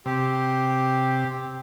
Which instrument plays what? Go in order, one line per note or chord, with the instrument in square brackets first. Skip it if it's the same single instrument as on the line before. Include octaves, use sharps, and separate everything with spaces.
[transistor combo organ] C3 [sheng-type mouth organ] G4